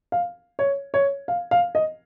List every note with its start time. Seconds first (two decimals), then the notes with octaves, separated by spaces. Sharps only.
0.12 F5
0.59 C#5
0.94 C#5
1.28 F5
1.51 F5
1.75 D#5